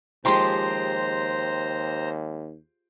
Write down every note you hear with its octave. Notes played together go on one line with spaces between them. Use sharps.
D#2 F3 G#3 G4 C5 G5 A#5 C6